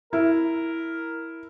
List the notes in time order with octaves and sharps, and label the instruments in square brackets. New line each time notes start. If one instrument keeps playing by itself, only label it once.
[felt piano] E4 [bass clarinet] A#4